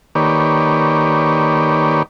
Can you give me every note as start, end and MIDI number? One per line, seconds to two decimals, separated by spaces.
0.15 2.03 51
0.15 2.03 58
0.15 2.03 67
0.15 2.03 71
0.15 2.03 73
0.15 2.03 74